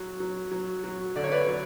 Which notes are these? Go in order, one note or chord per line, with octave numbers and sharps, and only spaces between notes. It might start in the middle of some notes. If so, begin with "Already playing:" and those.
Already playing: F#3
F#3
F#3
F#3
D3 D5
C#5
B4 D5
F#3